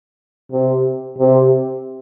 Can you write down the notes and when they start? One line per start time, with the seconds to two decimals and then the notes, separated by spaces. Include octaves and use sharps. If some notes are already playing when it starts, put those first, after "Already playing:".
0.52 C3
1.18 C3